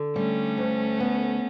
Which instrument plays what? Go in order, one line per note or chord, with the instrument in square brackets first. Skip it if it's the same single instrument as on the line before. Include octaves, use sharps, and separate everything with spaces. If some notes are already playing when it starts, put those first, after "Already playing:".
Already playing: [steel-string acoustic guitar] D3
[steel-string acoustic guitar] G3 [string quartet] A3 C#4
[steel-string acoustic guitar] D2
B3